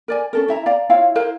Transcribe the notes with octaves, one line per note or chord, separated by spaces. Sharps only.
A#4 D5 G#5
C#4 A4 A#4
E4 E5 A#5
D5 F5 A#5
E4 F4 C#5 F5
E4 A#4 C5 F5